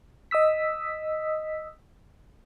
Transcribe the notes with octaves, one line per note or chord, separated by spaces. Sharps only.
D#5 D#6 E6 B6